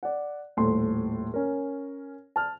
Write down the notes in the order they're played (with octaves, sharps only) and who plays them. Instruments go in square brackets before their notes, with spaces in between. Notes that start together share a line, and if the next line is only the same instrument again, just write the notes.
[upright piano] D5 F#5
D#1 A2 A4 C6
C#4 A#4
A5 F6